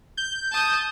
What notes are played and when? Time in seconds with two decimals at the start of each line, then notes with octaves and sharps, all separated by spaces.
0.17 G6
0.51 A5 D#6